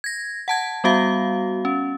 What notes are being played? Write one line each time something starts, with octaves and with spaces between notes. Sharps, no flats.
G#6 A#6
F#5 A5 G#6
G3 B3 F#4 F5
C#4